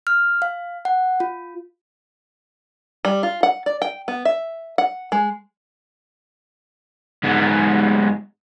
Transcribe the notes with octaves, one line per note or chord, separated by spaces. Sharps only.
F6
F5
F#5
F4
G3
F4
F#5
D5
G5
B3
E5
F#5
G#3
G#2 B3